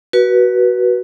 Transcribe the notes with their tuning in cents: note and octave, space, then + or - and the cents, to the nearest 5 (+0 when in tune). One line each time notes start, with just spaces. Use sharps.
F#4 +15 B4 -25